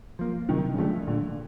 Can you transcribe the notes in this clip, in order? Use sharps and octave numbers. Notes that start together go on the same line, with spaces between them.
F3 A#3
C3 D#3
C#3
D3 F3 A3
A#2 D3